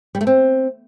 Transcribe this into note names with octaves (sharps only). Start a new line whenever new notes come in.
G3
A3
C4